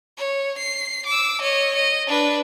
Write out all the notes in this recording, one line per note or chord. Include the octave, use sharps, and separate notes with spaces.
C#5
C7
D6 E6
C#5 D#5
D#5
D4 B4